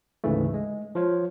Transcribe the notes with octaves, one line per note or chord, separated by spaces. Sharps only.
D2 G#2 C#3 E3 A3
G#3
F3 F4 C#5